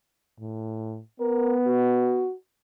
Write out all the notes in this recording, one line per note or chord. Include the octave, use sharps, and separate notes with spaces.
A2
B3 A#4
F#4